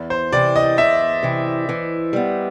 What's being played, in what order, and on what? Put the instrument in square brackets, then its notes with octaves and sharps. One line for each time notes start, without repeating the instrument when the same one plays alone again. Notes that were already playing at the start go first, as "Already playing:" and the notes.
Already playing: [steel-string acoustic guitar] E2
[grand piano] C5
[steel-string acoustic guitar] C3 E3 [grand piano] D5
[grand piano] D#5
[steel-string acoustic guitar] E2 [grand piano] E5
[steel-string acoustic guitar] C3 E3
E3
G3 B3